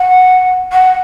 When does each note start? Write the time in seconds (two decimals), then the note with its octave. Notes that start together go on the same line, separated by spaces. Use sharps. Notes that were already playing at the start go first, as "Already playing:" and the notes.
Already playing: F#5
0.73 F#5